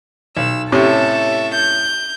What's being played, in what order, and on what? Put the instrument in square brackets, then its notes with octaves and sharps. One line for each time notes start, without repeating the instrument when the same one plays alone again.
[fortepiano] B1 [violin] E6
[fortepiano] A2 C3 C#4 [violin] A4 E5
[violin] G6